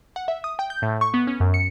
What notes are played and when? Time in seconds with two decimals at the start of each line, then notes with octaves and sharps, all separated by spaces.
0.16 F#5
0.28 E5
0.44 D#6
0.59 G5
0.70 G6
0.82 A2
1.01 C#6
1.14 B3
1.27 C#4
1.40 F#2
1.54 C#7